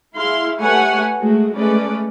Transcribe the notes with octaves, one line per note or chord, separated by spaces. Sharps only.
E4 G#4 F5 C6
A3 G4 B4 C#5 F#5 G#5
G#3 A3 F#4
G#3 A3 C#4 B4 D5